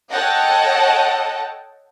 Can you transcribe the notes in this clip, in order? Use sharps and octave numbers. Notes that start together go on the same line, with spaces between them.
A4 C#5 D#5 F#5 G5 A5